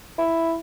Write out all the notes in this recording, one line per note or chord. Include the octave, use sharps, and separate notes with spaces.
E4